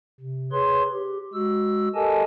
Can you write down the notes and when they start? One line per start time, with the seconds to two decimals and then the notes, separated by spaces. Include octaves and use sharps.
0.20 C3
0.52 G#4 B4 C#5 C6
0.92 G4
1.33 G#3 F#4 E6
1.95 G4 A4 A#4 D#5 G#5 A5